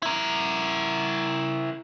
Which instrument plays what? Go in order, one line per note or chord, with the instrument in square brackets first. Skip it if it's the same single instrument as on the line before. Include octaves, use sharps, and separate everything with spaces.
[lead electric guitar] E4 A#4